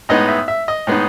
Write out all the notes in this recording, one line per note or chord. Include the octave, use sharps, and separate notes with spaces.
A2 G#3 B3 D#4 D#5
E5
E5
D#5
A2 G#3 B3 D#4